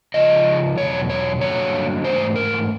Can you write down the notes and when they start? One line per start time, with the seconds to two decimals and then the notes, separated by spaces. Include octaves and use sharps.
0.14 C#3 F3 G#3 D#5
0.78 E2 B2 F#3 C#5
1.10 C#5
1.41 G2 D3 F#3 A#3 C#5
2.04 G#2 E3 A3 C5
2.36 A#4